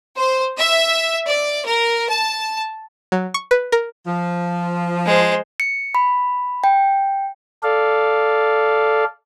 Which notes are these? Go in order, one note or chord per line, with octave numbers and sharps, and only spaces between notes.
C5
E5
D5
A#4
A5
F#3
C#6
B4
A#4
F3
G#3 C5
C#7
B5
G5
A4 D5 F5